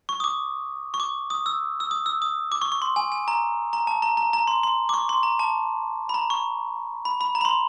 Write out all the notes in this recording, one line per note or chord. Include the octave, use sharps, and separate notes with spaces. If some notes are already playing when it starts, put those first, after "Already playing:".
C#6
D#6
D6
C#6
D6
D#6
E6
E6
D#6
E6
D#6
D6
C#6
C#6
C6
G#5
G#5
A#5
A#5
A5
A#5
A#5
A#5
C6
C6
D6
C#6
C6
A#5
A5
B5
A#5
C#6
B5
B5
A#5
B5
C6